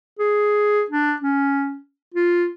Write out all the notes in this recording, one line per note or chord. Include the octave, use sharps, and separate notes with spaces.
G#4
D4
C#4
F4